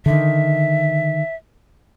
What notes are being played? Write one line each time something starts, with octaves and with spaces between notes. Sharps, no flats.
D3 D#3 E5